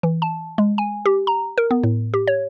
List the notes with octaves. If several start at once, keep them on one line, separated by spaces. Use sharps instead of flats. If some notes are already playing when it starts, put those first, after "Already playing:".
E3
A5
G#3
G#5
G4
A#5
A#4
B3
A2
G4
C#5